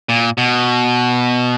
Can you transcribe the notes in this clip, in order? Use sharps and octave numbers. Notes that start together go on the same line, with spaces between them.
A#2
B2